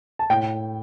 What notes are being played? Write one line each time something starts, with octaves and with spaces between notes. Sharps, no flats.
A5
A2 G5